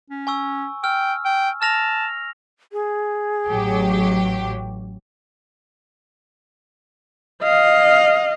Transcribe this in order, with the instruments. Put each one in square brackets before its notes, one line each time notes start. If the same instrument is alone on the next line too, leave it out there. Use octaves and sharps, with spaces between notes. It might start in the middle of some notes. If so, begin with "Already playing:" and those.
[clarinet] C#4
[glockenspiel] G#5 C#6 E6
[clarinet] G5 [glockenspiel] E6 F6
[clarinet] G5
[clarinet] A5 [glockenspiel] F6 A#6 F7
[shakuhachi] G#4
[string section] A1 F#3 G4
[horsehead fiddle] D#5 F5